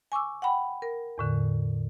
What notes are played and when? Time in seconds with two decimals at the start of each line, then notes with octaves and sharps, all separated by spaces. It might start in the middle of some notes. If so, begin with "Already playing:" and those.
0.12 G#5 C#6 D6 E6
0.42 F#5 G5 B5
0.82 A#4
1.18 E2 A2 D3